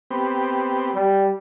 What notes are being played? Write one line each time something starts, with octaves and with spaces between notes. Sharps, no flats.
B3 C4 G4
G3